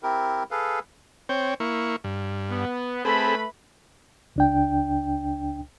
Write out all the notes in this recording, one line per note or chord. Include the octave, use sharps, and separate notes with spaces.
C4 E4 G4 A#4
G#4 A4 B4 F5
C4 C#5 G5
A#3 E4 C#6
G2
B3
A3 C4 G#4 A4 B4 B5
C#2 D4 G5